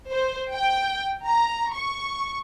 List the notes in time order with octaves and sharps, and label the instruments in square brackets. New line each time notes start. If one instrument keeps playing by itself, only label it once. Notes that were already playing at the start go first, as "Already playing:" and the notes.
[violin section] C5
G5
A#5
C#6